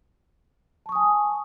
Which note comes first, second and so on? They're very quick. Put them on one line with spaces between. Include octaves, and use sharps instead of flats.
A5 C#6 D#6 G#5